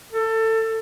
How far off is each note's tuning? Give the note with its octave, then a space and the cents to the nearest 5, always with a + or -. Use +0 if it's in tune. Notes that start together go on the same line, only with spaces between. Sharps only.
A4 +25